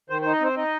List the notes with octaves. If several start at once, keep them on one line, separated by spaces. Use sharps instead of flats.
D#3 C5
D#4 C5
D#5
C4 C5
D#4 D#5